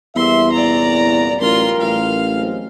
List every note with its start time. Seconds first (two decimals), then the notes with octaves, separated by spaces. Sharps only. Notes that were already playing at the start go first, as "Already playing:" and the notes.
0.16 E2 G3 A#3 E5 C6
0.52 C2 F#2 A#2 D5 A#5
1.41 A1 F#2 G3 F4 A#4 C6
1.81 A1 F5
2.32 F#3 G#3 C4